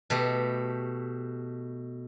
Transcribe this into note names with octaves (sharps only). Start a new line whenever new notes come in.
B2 A3 G4